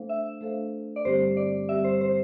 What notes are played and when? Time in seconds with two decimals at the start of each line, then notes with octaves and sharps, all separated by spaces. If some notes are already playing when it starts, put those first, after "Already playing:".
Already playing: A3 D4 A4 C5 F5
0.09 E5
0.41 A3 D4 A4 C5 F5
0.96 D5
1.05 G2 D3 G3 C4 G4 C5
1.37 D5
1.68 G2 D3 G3 C4 G4 E5
1.84 C5
2.01 C5